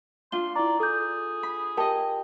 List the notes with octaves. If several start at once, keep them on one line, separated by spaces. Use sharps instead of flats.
D4 F4 C6 G7
E4 D5 A#5
G#4 A4 G6
B5
G4 A#4 D#5 G5 A5